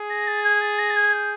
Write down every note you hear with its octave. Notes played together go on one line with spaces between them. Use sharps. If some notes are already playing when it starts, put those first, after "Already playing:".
Already playing: G#4
A#6
A6
G#6
A6
A#6
A6
G#6
G6